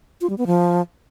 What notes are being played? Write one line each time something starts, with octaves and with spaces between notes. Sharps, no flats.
F4
G3
B3
F3